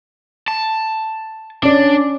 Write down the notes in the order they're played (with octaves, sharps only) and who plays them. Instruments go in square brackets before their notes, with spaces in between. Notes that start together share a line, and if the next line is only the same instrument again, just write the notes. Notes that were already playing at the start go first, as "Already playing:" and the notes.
[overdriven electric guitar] A5
[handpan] C#4 D5 [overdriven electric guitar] D4